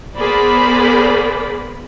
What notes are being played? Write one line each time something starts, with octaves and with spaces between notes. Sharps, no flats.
B3 G#4 A#4 C5 D5 B5